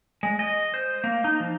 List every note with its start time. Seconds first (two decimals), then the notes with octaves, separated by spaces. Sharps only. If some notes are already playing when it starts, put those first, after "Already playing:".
0.23 G#3
0.39 D#5
0.74 C5
1.04 A#3
1.24 D#4
1.40 F3